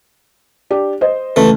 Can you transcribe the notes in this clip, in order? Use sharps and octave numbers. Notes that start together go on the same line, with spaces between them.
D4 G4
C5 D#5
C#2 E3 A3